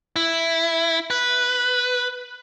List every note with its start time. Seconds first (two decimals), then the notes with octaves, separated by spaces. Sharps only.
0.16 E4
1.10 B4